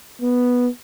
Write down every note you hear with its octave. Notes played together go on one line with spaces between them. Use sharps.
B3